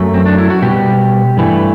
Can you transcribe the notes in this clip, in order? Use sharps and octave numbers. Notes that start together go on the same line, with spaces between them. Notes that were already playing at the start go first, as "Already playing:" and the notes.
Already playing: F#2 F#3 A3
C4
D4
E4
F#4
B2 G3 G4
G2 E3 A3